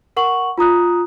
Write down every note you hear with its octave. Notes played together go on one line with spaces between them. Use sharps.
A#4 F#5 C#6 F#7
F4 A#5 D#6 F#6